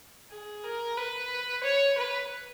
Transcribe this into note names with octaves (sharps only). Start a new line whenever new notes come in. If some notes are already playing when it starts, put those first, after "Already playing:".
G#4
A#4
B4
C#5
B4